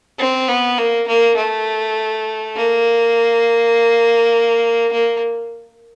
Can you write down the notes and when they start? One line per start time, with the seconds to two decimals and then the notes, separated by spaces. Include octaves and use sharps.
0.19 C4
0.48 B3
0.79 A#3
1.07 A#3
1.37 A3
2.55 A#3
4.92 A#3